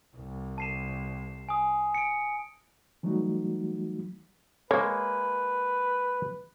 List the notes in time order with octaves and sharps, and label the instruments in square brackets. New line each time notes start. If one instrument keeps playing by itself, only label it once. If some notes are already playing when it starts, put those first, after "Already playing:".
[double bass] C2
[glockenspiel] A5 C7 E7
G#5 D#6
C#7 D7
[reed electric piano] E3 F#3 G3 A3 D#4 F#4
[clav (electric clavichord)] G#3 A#3 [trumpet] B4 [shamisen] C#5